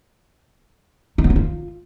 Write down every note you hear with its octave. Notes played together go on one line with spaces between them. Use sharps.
D#4
B3
D#4
F4